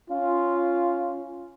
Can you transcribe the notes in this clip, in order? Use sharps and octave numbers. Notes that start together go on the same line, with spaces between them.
C#4 F4